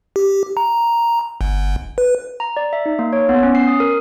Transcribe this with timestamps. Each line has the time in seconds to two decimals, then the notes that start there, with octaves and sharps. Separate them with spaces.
0.16 G4
0.57 A#5
1.41 G1
1.98 B4
2.40 A#5
2.57 D5
2.73 E5
2.86 D#4
2.99 A#3
3.13 C#5
3.29 B3
3.43 C#4
3.55 C7
3.67 D#6
3.80 A#4